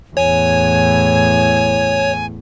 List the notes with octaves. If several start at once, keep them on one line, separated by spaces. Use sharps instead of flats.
E2 A2 C#5 G#5